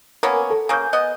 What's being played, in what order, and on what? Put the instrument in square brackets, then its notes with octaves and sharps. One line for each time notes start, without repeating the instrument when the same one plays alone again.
[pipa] A#3 B3 C#4 [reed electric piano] A#4 G#5
[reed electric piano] A4
[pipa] C#3 A#3 [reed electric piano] G#5 G6
[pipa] B3 D#5